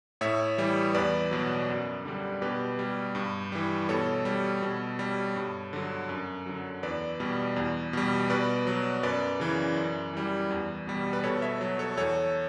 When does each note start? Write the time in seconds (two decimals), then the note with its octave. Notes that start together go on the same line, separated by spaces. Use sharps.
0.21 A2 C#5 E5
0.58 E3 G3
0.94 E2 B4 D5
1.31 B2 F#3
1.68 F#2
2.05 D3 G3
2.42 B2 G4 B4
2.79 G3
3.15 G2
3.52 E3 G3
3.89 B2 A4 C#5
4.25 G3
4.62 B2
4.99 G3
5.36 G2
5.73 D3 F#3
6.09 F#2
6.46 D3 F#3
6.83 E2 B4 D5
7.20 B2 G3
7.56 E2
7.93 B2 G3
8.30 B2 B4 D5
8.67 F#3
9.03 F#2 B4 D5
9.40 C#3 E3
9.77 F#2
10.13 E3 G3
10.51 E2
10.87 B2 G3
11.13 B4
11.24 B2 A4 C#5
11.42 C#5 E5
11.61 F#3
11.79 A4 C#5
11.97 E2 A4 C#5